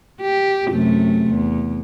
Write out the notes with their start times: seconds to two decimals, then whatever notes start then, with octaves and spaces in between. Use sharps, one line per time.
0.21 G4
0.68 F#2 C3 A3
1.30 E2